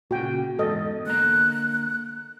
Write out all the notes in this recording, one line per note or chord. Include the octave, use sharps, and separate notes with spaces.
A#2 C#3 F#4 G5
E2 G#2 A4 D#5
D3 A#3 A#5 F#6